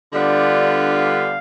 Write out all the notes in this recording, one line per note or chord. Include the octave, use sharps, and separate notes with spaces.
D3 G3 B3 D4 F4 D5
F5